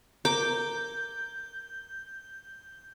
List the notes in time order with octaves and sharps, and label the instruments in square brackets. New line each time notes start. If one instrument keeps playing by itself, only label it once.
[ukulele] A#4 [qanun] D6 [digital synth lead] G6